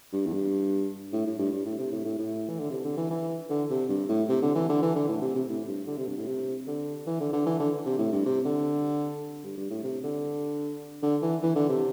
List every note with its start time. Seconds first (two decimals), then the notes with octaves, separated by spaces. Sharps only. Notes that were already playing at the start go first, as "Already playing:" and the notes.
0.13 G2
0.27 E2
0.33 G2
1.13 A2
1.26 A2
1.39 G2
1.52 G2
1.66 A2
1.78 C3
1.92 A2
2.05 A2
2.18 A2
2.49 E3
2.60 D3
2.70 C3
2.84 D3
2.97 E3
3.10 E3
3.50 D3
3.70 C3
3.89 G2
4.09 A2
4.29 C3
4.42 D3
4.55 E3
4.69 D3
4.82 E3
4.95 D3
5.09 A2
5.22 C3
5.35 C3
5.48 A2
5.68 G2
5.87 D3
5.97 C3
6.07 G2
6.17 A2
6.27 C3
6.67 D3
7.06 E3
7.20 D3
7.33 D3
7.46 E3
7.59 D3
7.86 C3
7.98 A2
8.12 G2
8.25 C3
8.45 D3
9.44 G2
9.57 G2
9.70 A2
9.84 C3
10.04 D3
11.03 D3
11.22 E3
11.43 E3
11.55 D3
11.69 C3